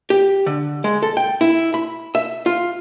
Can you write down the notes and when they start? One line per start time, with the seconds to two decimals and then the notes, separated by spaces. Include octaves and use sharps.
0.10 G4
0.46 D3
0.84 G#3
1.03 A4
1.17 G5
1.41 E4
1.74 B5
2.15 E5
2.46 F4